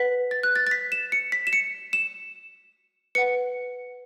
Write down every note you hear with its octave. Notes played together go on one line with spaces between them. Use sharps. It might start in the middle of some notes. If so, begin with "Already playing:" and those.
Already playing: B4 F#5 B6
A6
F#6
A6
A6
B6
E7
C#7
B6
E7
C#7
E7
B4 F#5 C#7